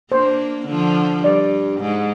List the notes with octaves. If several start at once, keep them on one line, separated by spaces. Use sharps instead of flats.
A#3 D4 C5
D3 F3
G2 D5
G#2